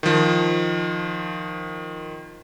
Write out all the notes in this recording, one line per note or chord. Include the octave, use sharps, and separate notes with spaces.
D#3 F3